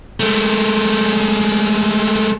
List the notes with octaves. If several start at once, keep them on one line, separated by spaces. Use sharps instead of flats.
G#3 A3